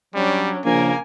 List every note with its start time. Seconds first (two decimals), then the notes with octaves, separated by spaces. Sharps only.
0.14 F#3 G3 C#4 D4
0.65 A#1 C#3 A#3 A#4 G#5